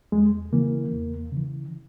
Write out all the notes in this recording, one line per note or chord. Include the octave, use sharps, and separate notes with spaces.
E2 G#3
C#3 E3 A#3
E2
C#3 E3